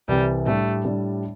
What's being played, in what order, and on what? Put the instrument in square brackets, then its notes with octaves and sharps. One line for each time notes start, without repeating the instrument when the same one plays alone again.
[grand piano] C2 C3 E3 C4 [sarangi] G3
[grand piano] A2 G3 D4 [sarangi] A3
[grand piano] A2 G3 D4